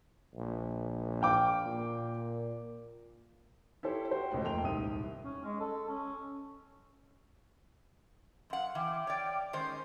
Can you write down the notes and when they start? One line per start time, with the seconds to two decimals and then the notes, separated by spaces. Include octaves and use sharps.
0.34 A#1
1.22 F5 G5 D6
1.66 A#2
3.83 E4 G4 A4 C5 C#5
4.11 F#4 G4 C5 G5
4.32 C#2 A2
4.44 F2 A3 A#3 G5 C6 F7
4.63 D#1 C2 G#2 D#6 D#7
5.21 C#4
5.44 G#3
5.60 A4
5.88 C#4
8.50 F#2 F5 F#5 C6
8.75 E3 G5 D6 F6
9.07 C#5 D5
9.53 D#3 G#3 C#4 C5 G6